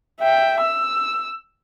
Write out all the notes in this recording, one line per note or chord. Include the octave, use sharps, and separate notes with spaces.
E5 G5
E6